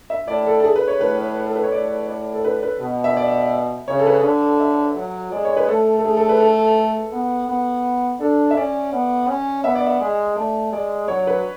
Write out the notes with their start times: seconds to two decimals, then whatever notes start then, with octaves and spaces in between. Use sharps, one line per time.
0.10 E5
0.28 A2 D5
0.47 A4
0.60 A4
0.64 G#4
0.76 B4
0.88 C#5
1.00 A2 B4
1.46 A4
1.56 B4
1.63 C#5
1.72 A2 D5
2.08 D5
2.34 A4
2.44 B4
2.63 B4
2.80 B2
3.04 E5
3.17 D5
3.88 C#3 C#5
3.99 A4
4.07 B4
4.24 D3 A4
4.60 E5
4.96 F#3
5.32 G#3 D5
5.45 C#5
5.57 B4
5.68 A3 A4
5.97 A4
6.05 A3 G#4
6.17 A4
6.29 B4
6.40 A4
7.13 B3
7.49 B3
8.20 D4 A4
8.51 E5
8.56 C#4 D5
8.93 B3
9.28 C#4
9.64 B3 E5
9.75 D5
9.87 E5
10.00 G#3
10.36 A3 D5
10.72 G#3 D5
11.08 F#3 C#5
11.27 B4